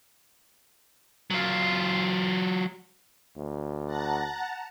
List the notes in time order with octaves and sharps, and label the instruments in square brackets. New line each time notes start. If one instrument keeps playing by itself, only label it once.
[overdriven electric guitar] F#3 F4
[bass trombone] D2
[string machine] F#5 A5 A#5